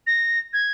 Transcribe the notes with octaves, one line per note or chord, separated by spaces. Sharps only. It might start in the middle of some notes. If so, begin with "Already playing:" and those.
A#6
G#6